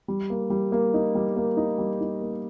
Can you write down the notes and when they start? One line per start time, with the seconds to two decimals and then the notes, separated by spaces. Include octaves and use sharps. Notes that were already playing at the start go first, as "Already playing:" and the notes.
0.08 G3
0.30 A#3
0.50 G3
0.72 A#3
0.94 D#4
1.15 G3
1.36 A#3
1.57 D#4
1.78 G3
2.01 D#4
2.21 A#3